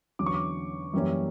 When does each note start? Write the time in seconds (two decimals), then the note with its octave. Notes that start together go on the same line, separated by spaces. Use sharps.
0.19 E2 D3 F#3 C#4 D6
0.26 C#6
0.34 D6
0.93 F#2 E3 G3 A#3 C#4